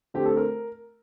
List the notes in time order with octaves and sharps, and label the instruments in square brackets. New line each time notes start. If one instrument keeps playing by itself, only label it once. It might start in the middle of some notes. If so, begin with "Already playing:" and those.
[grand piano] D3 A3 C4 G4
A4
A#4